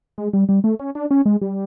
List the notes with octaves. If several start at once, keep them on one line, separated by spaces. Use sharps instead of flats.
G#3
G3
G3
A3
C#4
D4
C#4
G#3
G3